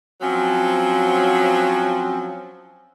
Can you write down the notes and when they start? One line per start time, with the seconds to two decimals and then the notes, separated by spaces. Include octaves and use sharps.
0.21 F3 F#3 C4 C#4